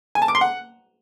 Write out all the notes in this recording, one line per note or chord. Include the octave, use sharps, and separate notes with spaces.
G#5
A5
D6
C6
F#5